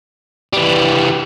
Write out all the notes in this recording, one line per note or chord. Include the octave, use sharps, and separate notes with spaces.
E3 G3